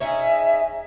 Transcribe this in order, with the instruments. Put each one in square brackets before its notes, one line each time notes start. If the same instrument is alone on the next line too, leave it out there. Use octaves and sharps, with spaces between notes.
[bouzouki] C#4 D#4 G#4 [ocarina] E5